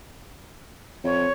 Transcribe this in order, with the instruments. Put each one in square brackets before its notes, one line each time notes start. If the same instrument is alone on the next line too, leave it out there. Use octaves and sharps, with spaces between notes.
[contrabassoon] F2 [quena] C#5